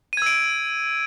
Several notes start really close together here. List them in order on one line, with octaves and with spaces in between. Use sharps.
D#7 G#6 E6 D7